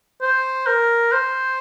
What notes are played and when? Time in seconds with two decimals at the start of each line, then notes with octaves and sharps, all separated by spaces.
0.22 C5
0.67 A#4
1.12 C5